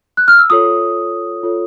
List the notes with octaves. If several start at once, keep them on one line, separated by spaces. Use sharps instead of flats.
F#6
F6
E6
F4 A4 C#5 D#6
F4 A4 C#5